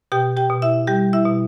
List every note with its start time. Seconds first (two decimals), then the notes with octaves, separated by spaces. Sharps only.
0.12 B2 G4 G5
0.37 G4 G5
0.50 B2
0.62 E4 E5
0.87 G3 G4 G5
1.13 E4 E5
1.26 B2